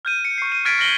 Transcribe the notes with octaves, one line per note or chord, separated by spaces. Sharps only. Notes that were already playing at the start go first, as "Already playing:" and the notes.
F6 G6 D#7
C#7
C#6 C7
D#7
F6 G#6 A6 B6 D7
F6 A#6 D7 F#7 G7